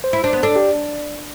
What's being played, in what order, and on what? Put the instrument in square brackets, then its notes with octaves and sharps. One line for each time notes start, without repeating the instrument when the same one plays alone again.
[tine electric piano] C5
[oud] E4
[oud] D4 [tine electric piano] C5
[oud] B3
[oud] D4 [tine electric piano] A4
[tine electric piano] G4